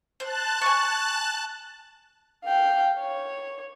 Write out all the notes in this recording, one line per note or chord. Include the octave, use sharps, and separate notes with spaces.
C5 A5 F#6
G#5 C#6
F5 G5
C#5